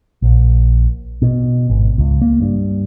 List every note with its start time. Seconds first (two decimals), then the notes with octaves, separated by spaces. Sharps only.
0.22 A#1
1.22 B2
1.70 G#1
1.98 C#2
2.22 A#3
2.42 G2